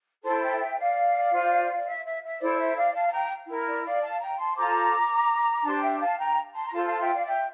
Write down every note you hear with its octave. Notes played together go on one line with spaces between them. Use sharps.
E4 A4 C5 A5 C6
E5 G5
E5 G5
D5 F5
F4 C5
E5
E5
E5
E4 A4 C5 D5
E5
D5 F5
F5 A5
A5
G5 A#5
E4 A#4
D5
D5 F5
F5 A5
G5 A#5
A5 C6
F4 A4 C5 A#5 D6
D4 G4 C5 A5 C6
E5 G5
F5 A5
G5 A#5
A5 C6
A#5
F4 A4 C5 A5 C6
F5 A5
E5 G5
D5 F5
E5 G5